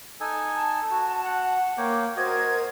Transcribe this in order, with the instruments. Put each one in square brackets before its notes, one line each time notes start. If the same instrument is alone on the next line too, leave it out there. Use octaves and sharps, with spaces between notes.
[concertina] D#4 A4 G#5
[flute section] A5
[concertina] F#4
[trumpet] F#5
[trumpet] A#3 [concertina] C#5 G5 D6
[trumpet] F#4 [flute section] A#4 C5 G#6 [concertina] D#5